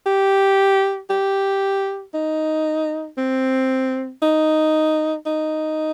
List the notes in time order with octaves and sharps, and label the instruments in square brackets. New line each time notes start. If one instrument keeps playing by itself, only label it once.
[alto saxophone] G4
G4
D#4
C4
D#4
D#4